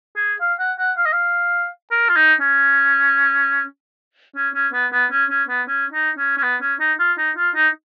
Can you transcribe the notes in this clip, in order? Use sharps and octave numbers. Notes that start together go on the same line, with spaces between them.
G#4
F5
F#5
F#5
F5
D#5
F5
A#4
F4
D#4
C#4
C#4
C#4
B3
B3
C#4
C#4
B3
C#4
D#4
C#4
C#4
B3
C#4
D#4
F4
D#4
F4
D#4